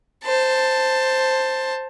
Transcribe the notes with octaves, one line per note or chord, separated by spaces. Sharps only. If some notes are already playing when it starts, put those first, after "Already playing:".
C5 A5